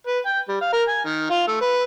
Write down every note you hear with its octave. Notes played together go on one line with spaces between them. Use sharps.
B4
G5
G3
F5
A#4
G#5
D#3
F4
A3
B4